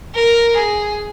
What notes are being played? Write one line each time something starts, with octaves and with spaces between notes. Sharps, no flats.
A#4
G#4